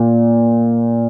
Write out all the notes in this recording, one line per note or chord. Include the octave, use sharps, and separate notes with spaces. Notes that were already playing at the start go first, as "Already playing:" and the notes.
Already playing: A#2